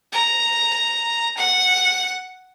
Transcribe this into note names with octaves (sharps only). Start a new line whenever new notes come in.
A#5
F#5